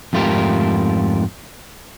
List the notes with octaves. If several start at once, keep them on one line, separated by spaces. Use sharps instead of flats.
F2 G#2 A3 F4 G4 A#4